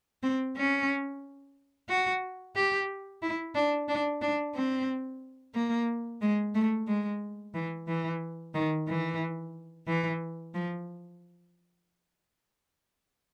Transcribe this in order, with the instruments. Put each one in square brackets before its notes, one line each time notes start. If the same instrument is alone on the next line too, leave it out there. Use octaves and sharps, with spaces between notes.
[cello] C4
C#4
F#4
G4
E4
D4
D4
D4
C4
A#3
G#3
A3
G#3
E3
E3
D#3
E3
E3
F3